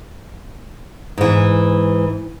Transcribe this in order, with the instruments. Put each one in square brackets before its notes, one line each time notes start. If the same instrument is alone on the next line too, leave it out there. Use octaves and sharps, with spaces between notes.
[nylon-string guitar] G#2 E3